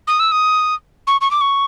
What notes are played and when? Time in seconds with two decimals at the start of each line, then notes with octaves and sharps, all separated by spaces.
0.07 D#6
0.20 E6
0.32 D#6
1.07 C#6
1.21 C#6
1.31 D6
1.41 C#6